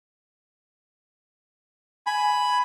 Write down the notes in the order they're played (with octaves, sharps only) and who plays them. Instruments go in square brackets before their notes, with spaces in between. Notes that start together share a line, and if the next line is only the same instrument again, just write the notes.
[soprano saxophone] G#5 [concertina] B5